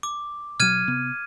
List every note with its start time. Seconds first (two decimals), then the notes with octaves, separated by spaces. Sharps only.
0.03 D6
0.60 B2 F#3 F6 G#6 D#7
0.88 C3 B3